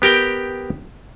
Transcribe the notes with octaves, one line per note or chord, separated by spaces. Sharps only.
B3 G4 A#4 G5